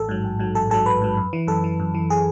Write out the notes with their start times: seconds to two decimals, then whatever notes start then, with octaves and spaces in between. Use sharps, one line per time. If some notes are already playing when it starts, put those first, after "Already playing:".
Already playing: A1 A4
0.09 G#2 F#3
0.24 A1
0.39 G#2 F#3
0.55 A1 A4
0.70 G#2 F#3 A4
0.86 A1 B4
1.02 G#2 F#3
1.17 F#2
1.33 E3
1.47 F#2 A4
1.64 E3
1.80 F#2
1.94 E3
2.10 G#4